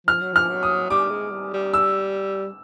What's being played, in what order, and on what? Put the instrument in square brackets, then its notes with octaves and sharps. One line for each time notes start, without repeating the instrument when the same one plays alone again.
[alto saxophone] F3 [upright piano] F6
[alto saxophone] F#3
[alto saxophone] F3 [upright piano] F6
[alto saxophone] F#3
[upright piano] D#6
[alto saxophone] G3 [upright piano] D6
[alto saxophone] G#3
G3
G3
[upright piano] E6